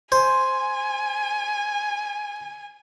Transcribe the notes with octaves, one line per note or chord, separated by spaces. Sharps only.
C5 G#5